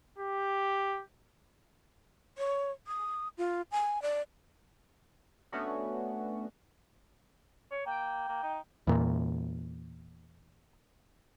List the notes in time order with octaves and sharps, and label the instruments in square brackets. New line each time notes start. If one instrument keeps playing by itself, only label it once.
[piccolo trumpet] G4
[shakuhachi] C#5
D#6
F4
G#5
D5
[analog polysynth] A3 B3 C#4 D4 F#4
[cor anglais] C#5
[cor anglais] A#3 [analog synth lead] G5
[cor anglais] A#3
D#4
[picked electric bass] E2 A#2